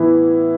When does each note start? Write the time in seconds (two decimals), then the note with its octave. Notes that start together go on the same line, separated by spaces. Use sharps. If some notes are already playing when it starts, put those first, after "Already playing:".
Already playing: A2 E3 B3 E4